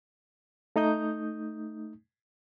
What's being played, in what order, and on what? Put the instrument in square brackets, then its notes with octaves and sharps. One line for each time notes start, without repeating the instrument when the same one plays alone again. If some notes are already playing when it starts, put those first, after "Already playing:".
[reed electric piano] A3 D#4 D#6 G6